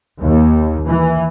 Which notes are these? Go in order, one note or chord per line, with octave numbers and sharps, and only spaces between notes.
D#2
E3